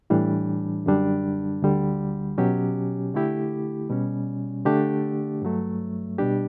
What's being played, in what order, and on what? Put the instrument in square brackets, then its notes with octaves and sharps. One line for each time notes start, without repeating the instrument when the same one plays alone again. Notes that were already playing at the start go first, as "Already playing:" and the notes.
[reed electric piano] A2 E3 G3 D4
F#2 D3 G3 D4
D2 D3 G3
B2 F#3 C#4 G4
D3 A3 E4 G4
B2 G3 C#4
D3 A3 D4 G4
G2 F#3 A3
B2 G3 D4 G4